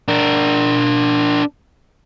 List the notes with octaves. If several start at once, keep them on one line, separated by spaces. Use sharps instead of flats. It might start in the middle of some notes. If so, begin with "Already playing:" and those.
D4 A#4